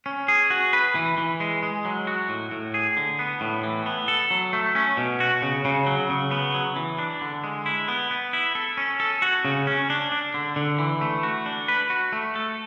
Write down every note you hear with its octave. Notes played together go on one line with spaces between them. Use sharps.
C#4
G#4
F#4
B4
E3
E3
G#3
G#3
F#3
F#4
A2
A2
G#4
D3
B3
A2
E3
B3
A4
F#3
A3
C#4
B2
F#4
C#3
C#3
F#3
C#3
B3
F#3
E3
D4
D3
G#3
E4
B3
B3
E4
A4
C#4
A4
F#4
C#3
C#4
D4
D4
D3
D3
E3
A3
F#4
D4
B4
F#4
A3
A4